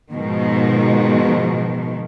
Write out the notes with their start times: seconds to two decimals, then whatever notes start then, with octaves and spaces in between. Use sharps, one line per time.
0.12 G#2 B2 D#3 F3